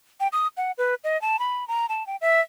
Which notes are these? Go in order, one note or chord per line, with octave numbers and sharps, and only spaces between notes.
G5
D#6
F#5
B4
D#5
A5
B5
A#5
A5
G5
E5